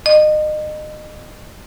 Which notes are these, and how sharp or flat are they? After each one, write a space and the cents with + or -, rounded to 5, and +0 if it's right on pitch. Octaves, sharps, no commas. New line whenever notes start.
D#5 -30